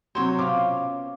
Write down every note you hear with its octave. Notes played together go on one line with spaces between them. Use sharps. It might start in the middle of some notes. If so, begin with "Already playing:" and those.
C3 F#3 C5 C#5
B2 C#4 F4 D6